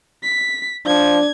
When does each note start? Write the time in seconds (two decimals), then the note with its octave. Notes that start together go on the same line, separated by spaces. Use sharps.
0.23 B6
0.86 F3 D4 G#6